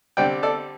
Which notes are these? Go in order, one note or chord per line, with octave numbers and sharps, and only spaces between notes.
D3 G3 C4 D5 G5
A4 D5